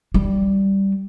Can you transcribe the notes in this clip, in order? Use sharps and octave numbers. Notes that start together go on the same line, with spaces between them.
G3